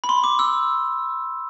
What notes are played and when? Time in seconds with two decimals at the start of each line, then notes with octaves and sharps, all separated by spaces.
0.04 B5
0.09 C6
0.24 D6
0.39 E6